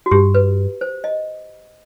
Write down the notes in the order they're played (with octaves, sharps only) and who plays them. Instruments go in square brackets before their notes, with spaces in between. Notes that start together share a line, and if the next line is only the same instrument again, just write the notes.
[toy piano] F#4
[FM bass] G2 [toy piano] G4
[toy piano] B4
C5
D#5